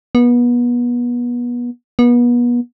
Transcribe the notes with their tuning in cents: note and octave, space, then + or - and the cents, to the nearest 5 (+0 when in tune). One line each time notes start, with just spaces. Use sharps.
B3 -30
B3 -35